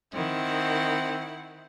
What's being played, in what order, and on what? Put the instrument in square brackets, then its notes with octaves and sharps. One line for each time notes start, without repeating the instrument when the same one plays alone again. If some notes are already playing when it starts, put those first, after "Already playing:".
[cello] D#3 [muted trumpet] C4 [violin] E4 F#5